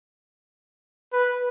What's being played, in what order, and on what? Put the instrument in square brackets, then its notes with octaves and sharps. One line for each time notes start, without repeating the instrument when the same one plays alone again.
[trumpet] B4